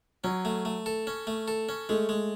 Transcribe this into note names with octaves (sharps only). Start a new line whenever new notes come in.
F#3 C#4
A3
A3
A4
C#4
A3
A4
C#4
G#3 A3
G#3